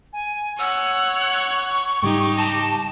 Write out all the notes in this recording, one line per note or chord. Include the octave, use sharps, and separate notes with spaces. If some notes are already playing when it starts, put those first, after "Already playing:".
G#5
C#5 F#5 E6
C#6
G#2 C#3 G3 D#4 G4
A5 A#6